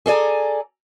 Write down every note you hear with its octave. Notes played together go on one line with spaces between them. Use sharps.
G#4 A4 D5 G#5 A#5